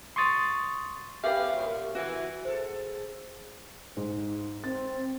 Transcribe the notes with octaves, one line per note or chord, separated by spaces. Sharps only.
C6 C#6 D#6 A6
C#4 F#4 G4 B4 E5 F5
F#2 A#2
E3 F#4
G#4 A4 C5
G#2
C4 A6